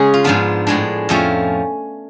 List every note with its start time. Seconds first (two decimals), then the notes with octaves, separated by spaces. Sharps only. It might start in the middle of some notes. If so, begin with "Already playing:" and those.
Already playing: C#3 G#3 C#4 G#4 C#5
0.14 F4
0.24 G#2 F3 B3 D4
0.67 A2 G#3 D4
1.09 F2 F3 A3 C#4